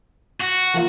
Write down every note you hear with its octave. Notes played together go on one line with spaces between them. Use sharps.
F#4
F3 A#3 F4